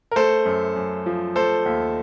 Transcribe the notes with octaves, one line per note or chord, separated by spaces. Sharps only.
A#4
A3 A4 C5
F#2
F#2
F3
A3 A4 C5
D#2